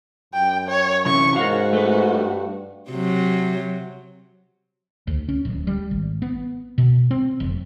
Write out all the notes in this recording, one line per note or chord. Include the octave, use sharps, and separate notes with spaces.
F#2 G5
C#5
C3 E3 C#4 C#6
G#2 F#4 A#4 C#5 F5
A3 B4
G2
C3 F#3
D2
C#4
D1
G3
G#1
B3
B2
C4
F1